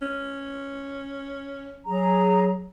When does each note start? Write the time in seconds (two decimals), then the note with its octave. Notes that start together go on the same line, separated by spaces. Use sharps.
0.02 C#4
1.87 F#3 G#4 A#5